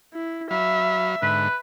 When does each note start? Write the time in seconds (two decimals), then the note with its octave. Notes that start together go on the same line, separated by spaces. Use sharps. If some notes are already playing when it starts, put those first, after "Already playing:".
0.14 E4
0.51 F#3 E5 F5 B5
1.22 G#2 D3 B4